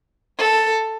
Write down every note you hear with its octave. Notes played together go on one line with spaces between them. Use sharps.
A4